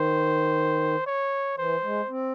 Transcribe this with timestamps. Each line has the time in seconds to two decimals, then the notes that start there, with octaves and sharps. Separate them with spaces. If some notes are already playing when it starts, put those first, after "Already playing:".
Already playing: D#3 C5
1.06 C#5
1.58 E3 C5
1.83 G#3
2.09 C4